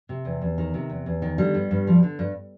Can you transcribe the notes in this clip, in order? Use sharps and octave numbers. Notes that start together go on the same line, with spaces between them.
C3
E2
E2
D#3
C3
E2
E2
D#3
D3 G3
G2
G2
F3
D3
G2